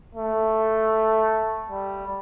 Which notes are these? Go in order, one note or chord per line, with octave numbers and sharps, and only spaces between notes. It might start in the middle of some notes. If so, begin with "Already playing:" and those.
A3
G3